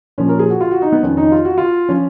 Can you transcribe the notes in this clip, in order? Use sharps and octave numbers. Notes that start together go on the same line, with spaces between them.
A#2 F3 C#4
A#4
G#4
F#4
F4
F#4
D#4
B3
F2 D#3 C#4
D#4
F4
F#4
F4
F3 C#4